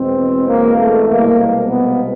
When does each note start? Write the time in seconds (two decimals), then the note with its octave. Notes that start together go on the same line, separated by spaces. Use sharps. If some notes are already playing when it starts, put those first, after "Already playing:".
Already playing: E2 B2 G#3 C4
0.46 A#3
0.76 A3
1.07 C2 B2 G#3 A#3
1.68 B3